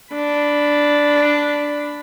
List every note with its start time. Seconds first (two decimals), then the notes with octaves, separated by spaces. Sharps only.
0.14 D4 B5